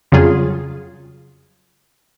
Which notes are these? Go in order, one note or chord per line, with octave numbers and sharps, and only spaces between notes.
F2 C#3 F#3 G3 F4 G#4